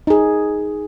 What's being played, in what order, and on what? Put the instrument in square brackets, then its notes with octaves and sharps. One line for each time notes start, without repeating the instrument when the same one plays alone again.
[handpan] D#4 G#4